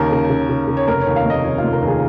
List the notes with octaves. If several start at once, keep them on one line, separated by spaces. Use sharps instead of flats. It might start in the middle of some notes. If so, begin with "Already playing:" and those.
Already playing: D#2 C#3 A#4
C#3
C#3
C#3
C#3
C#5
F1 A#4
D#2 C#5
F5
F1 D#5
D#3 C#5
F4
F1
A#4
D#2 G#4